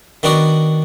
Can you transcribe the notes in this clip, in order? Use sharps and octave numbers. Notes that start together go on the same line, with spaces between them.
D#3 B3 D4 F#4 D5 D#5